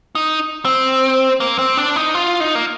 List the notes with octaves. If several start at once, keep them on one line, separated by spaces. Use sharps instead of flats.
D#4
C4
A#3
C4
D4
D#4
F4
D#4
A#3